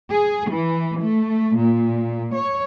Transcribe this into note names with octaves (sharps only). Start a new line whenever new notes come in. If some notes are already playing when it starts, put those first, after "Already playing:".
G#4
E3
A3
A#2
C#5